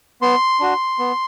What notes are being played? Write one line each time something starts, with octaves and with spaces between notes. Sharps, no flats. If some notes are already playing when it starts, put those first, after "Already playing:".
B3 C6
D4 F#4
B3